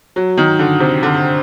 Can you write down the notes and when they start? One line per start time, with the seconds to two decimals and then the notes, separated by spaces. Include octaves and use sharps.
0.16 F#3
0.37 D#3
0.59 D3
0.80 C3
1.03 D3